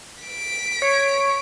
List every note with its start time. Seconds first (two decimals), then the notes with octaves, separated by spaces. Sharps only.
0.24 B6 D7
0.82 C#5